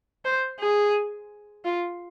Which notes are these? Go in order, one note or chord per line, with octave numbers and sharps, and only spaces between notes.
C5
G#4
F4